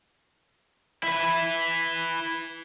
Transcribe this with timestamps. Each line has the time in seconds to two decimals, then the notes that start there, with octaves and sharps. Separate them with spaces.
1.03 E4 B4